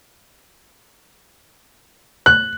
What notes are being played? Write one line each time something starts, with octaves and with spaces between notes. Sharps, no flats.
F#6